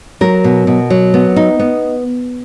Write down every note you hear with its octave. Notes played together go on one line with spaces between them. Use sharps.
F#3 A#4
B2
B2
F#3
B3
D#4
B3